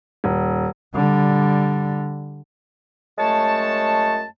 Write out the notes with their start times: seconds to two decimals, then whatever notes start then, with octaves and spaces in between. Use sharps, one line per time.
0.24 D#1
0.95 D3 G3
3.18 F#2 G#3 A3 C#5 A5